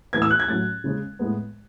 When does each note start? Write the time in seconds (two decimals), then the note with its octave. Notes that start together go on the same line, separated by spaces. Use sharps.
0.13 A2 E3 B3 G#6
0.22 E6
0.31 F#6
0.40 G#6
0.48 A2 F#3 C#4 A6
0.84 C#3 G#3 C#4
1.19 A2 G#3 B3